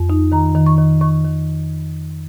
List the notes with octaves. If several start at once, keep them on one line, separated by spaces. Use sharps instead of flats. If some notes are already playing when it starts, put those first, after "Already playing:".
Already playing: F2
D#4
D#3 A#5
D#3
C#6
D#3
D#3 C#6
D#3